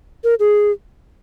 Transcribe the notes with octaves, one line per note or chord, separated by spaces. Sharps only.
A#4
G#4